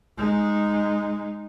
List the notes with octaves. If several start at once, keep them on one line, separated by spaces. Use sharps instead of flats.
G#3 D#4